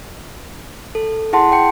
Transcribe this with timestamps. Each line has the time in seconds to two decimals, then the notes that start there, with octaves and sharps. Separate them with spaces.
0.95 A4
1.33 E4 G#4 F#5 A5 C6
1.52 G5 C#7